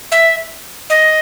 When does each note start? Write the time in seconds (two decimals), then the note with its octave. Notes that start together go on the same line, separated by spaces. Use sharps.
0.12 E5
0.90 D#5